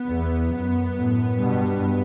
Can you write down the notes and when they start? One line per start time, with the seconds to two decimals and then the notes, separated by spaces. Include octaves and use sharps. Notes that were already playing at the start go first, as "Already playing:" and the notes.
Already playing: B3
0.09 E2
0.53 F#2
0.96 F#2 A2
1.40 G2 B2